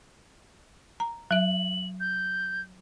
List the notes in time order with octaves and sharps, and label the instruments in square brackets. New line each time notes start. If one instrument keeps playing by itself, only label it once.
[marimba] A#5
[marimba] F#3 E5 [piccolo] F#7
[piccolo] G6